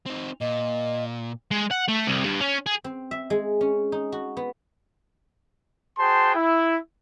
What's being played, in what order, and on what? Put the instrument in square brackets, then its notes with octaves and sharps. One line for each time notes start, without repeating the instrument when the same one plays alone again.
[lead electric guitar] C4 D#4
[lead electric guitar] A#2 [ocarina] D#5
[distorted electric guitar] G#3
F#5
A3
C2
G2
C#4
G#4
[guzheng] C4
E5
G#3
C#4
D#4
F#4
B3
[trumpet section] F#4 G#4 C5 G5 A5 C6
E4